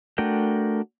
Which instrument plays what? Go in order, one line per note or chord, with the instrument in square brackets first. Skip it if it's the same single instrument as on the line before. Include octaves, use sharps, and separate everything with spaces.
[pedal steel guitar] A3 D4 F#4 A#4 G5